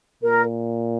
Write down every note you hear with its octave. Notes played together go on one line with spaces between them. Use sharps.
A#2 A#4